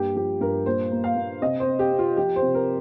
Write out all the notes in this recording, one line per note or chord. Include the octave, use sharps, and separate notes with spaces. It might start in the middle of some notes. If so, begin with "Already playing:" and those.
Already playing: G2 A#3 G4
F3 G4
G2 A#4
A#2 C5
A#3
F5
A#3
C3 D#5
C5
C4
G4
C4
F4
F3 G4
C5
C3
A#4